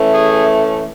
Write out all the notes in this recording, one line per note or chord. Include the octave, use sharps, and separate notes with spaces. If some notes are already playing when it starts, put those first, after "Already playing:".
Already playing: E3 A3 C#4
G#4